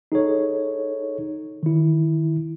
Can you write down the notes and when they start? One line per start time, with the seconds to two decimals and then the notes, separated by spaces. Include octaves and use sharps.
0.12 D#4 G#4 A4 C#5
1.63 D#3 E4